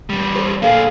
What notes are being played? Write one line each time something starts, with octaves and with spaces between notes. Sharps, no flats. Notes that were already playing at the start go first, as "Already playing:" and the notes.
E2 G3
A4 C5
A#2 D3 A#3 G#4 A4 F5